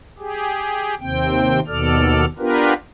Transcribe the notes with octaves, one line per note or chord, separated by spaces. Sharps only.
G4 G#4
D#2 C3 C4 G5
D#2 B2 A4 D5 F6
B3 D4 F4 G4 A#4 B4